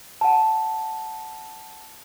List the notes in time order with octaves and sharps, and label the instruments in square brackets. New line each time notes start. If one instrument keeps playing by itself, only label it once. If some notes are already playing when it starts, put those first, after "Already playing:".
[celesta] F#5 A5